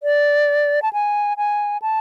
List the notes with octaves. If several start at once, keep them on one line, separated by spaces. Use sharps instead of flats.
D5
A5
G#5
G#5
A5